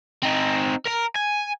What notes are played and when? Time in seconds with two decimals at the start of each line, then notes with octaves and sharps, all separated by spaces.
0.23 C4 D#4
0.86 A#4 A#5
1.16 G#5